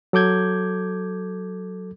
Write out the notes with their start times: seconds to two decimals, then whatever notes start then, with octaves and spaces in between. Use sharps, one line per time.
0.13 F#3 A4 D6 G6 G#6